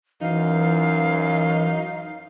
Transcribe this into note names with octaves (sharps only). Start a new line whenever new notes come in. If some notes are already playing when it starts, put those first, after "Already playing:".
F#2 E3 D#4 F5